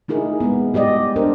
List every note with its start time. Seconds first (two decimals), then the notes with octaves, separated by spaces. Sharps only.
0.08 A3 D#4 E4 G#4 A#4
0.40 G#3 B3
0.74 G3 G4 D5 D#5
1.16 D4 A#4 C5